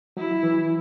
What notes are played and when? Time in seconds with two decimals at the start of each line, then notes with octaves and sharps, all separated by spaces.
0.17 F#3 E4
0.43 E3